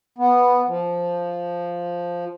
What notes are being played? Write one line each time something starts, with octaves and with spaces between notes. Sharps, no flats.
B3
F3